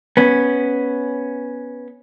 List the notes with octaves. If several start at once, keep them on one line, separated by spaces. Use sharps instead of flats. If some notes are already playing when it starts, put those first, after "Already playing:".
B3 C#4